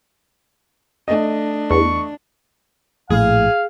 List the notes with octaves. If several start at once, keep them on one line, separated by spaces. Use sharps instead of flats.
A3 D4 D#5
E2 C#6
A#1 A2 G#4 F5